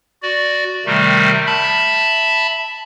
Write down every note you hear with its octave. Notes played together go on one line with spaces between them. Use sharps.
F#4 D5
C3 D#3 G3 A3
E5 A5 B5